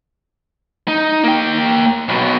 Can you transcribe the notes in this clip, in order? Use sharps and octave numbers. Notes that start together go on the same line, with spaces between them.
D#4
A#3 G5
B1 B2